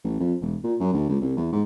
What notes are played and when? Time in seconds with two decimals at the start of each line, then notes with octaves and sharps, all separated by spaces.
0.04 A1
0.20 F2
0.41 E1
0.64 A#2
0.80 F#2
0.93 D2
1.09 C#2
1.22 C2
1.37 E2
1.52 G#2